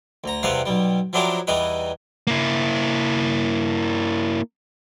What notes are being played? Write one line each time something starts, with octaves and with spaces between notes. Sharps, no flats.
D2 A#5
E2 C3 G3 B4 F5
B1 G3
F3 F#3 D4 E4 G4 A#4
E2 E3 G3 D#4 B4
A#3 E4